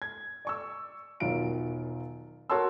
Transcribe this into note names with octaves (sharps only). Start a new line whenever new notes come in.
G#6
D5 C#6 E6
E1 D#3 F#3 F4 D7
F#4 A#4 C#5 A5 C6 E6